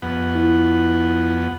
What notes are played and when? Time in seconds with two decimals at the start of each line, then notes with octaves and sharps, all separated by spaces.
0.02 F2 B3 F#5
0.35 E4